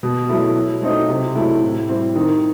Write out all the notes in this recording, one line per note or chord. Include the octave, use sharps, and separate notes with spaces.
B2
F#3 A3 E4
F#3
A3 C4 D#4
C3
F#3 A3 E4
A2
G3 C4
D#3